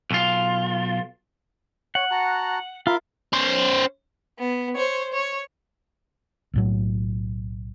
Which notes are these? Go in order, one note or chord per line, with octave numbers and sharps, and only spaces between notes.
B1 F4
C#5 F#5
F#4 A5 A#5
F4 A#4 E5 B5
C#4 C5
B3
C5 C#5
C#5
B1 A2 F#3